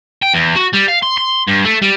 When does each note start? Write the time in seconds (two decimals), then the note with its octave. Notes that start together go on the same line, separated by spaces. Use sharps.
0.23 G5
0.35 E2
0.56 F#4
0.74 G3
0.89 F5
1.03 C6
1.18 C6
1.48 G2
1.65 A3
1.82 G3